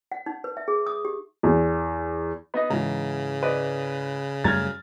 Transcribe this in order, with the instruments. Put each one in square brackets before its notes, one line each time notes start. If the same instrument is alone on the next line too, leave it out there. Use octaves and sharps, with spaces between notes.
[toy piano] F#5
D#4
B4
E5
G#4
D#6
G4
[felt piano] E2
[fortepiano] B3 D#4 D#5
[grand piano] G#2 E3 [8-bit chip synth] C#3 [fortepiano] A#5
[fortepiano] B4 D5 D#5
[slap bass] F#2 G3 A3 [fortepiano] A#5 [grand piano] F6 G#6 A6